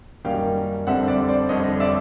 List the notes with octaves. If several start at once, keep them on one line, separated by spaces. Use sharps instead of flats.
F#2 D#3 G3 A#3 C#4 F5 G5
F2 D3 G3 C4 E5 F#5
D5 E5
C5 D5
F2 D3 G3 C4 C#5 D#5
D5 E5